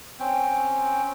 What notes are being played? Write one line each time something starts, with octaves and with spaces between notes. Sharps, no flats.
C4 C#4 G5